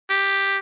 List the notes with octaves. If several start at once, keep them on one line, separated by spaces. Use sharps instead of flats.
G4